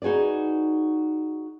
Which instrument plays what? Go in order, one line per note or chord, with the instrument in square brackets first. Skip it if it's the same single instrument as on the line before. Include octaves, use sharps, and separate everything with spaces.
[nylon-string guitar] D#4 F#4 G#4 B4 D5